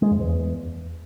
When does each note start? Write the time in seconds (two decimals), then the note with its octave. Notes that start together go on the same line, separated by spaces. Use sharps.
0.02 G#3
0.11 F2
0.20 E2